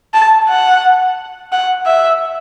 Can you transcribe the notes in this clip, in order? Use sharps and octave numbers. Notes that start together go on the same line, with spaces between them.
A5
F#5
F#5
E5